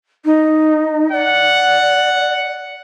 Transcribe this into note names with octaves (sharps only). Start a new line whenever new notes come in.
D#4
D5 F#5